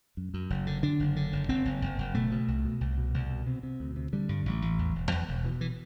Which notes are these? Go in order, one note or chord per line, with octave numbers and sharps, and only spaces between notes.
F#2
F#2
F#1
D3
D3 D4
F#1
D3
F#1
F#1 C4
F#1
F#1
F#1
B2 A3
B2
C2
B2
C2
B2
C2
B2
C3
C3
D2
C3
D3 G3
G2
A1
A1
E2
E1
E2
E1
B2 E3
E3